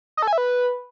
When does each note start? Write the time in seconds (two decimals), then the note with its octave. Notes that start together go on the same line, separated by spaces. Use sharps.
0.17 D#5
0.22 A4
0.28 G#5
0.33 E5
0.38 B4